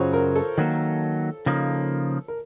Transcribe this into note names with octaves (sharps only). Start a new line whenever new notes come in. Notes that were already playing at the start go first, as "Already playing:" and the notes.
Already playing: F#2 C#3 F#3 F4 C5 C#5
A#4
A4
D#3 F#3 A#3
C#3 F3 A#3 D#4
A#4